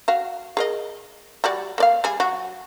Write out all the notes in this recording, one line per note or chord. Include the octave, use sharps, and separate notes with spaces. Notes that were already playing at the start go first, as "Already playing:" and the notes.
F#4 F5
G#4 A#4 D#5
G3 F#4 D5
A#3 D5 F5
G3 G#4
F#3 F#4